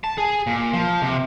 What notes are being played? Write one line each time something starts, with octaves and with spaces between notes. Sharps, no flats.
A5
G#4
A#2
F3
C3